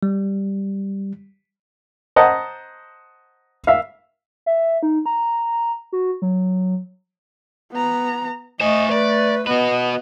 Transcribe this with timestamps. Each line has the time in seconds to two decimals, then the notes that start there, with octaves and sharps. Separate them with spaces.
0.03 G3
2.16 C5 D#5 F#5 A5 A#5
3.67 E5 F5
4.46 E5
4.83 D#4
5.06 A#5
5.92 F#4
6.22 F#3
7.72 B3 A#5
8.60 A3 C5 D#5 G#5
8.91 B4 D5
9.47 B3 F#4 B4 D#5